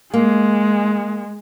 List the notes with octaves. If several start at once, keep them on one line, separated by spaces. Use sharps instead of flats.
G#3 A#3